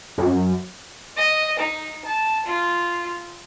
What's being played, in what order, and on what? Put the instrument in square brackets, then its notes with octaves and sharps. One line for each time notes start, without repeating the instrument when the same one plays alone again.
[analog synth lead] F#2
[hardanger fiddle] D#5
D#4
A5
F4